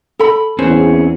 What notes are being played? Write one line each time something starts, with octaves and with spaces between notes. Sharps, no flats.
A4 B5
E2 C4 C#4 G#4 B4 C5